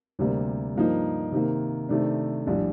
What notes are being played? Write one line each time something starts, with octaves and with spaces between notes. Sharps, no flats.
D2 C3 G3 A#3
G2 F3 A#3 D#4
C3 D#3 A#3
C3 D#3 A3 D4
A#1 A2 G3 D4